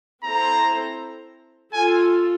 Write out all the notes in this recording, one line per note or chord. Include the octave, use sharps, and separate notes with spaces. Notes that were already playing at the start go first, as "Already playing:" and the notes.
C4 E4 A4 C5 A#5
F4 A4 G#5